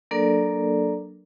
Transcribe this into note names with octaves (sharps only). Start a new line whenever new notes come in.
F#3 A#3 D4 A4 A#4 D5